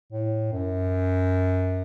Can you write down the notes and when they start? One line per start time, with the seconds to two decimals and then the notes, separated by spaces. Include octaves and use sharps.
0.12 A2
0.53 F#2